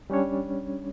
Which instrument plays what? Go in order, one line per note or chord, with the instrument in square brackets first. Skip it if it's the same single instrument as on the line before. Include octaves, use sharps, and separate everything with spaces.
[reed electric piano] G3 C#4 D4 C#5